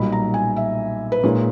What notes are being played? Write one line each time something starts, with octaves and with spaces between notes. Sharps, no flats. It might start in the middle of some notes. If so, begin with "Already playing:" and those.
Already playing: B1 A#2 G3 B5
A#5
G#5
E5
B4
A#2 G#3 D#4 C#5